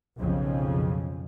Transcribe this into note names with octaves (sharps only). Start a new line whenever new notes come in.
B1 F2 C#3 F3